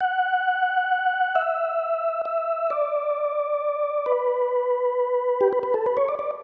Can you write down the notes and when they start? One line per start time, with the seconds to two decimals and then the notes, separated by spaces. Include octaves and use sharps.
0.01 F#5
1.35 E5
2.25 E5
2.70 D5
4.06 B4
5.41 G4
5.53 B4
5.63 B4
5.74 A4
5.86 B4
5.97 C#5
6.09 D5
6.19 D5